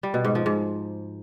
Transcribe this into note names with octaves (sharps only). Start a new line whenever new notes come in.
G3
B2
G#2
F3
G#2